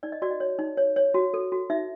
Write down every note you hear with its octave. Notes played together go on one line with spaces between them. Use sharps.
D#4 D5
D#5
F#4 D5
D#5
C#5
D#4
C#5
C#5
F#4
A4
F#4
D#4 E5